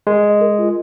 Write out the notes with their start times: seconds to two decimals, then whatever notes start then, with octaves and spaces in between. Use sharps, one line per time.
0.07 G#3 A#4
0.23 D#5
0.41 A#4
0.59 F4